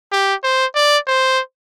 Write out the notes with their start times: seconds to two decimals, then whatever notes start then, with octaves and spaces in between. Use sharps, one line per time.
0.12 G4
0.43 C5
0.75 D5
1.07 C5